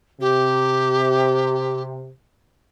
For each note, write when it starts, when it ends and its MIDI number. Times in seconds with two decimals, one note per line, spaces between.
0.20 2.10 48
0.20 1.82 67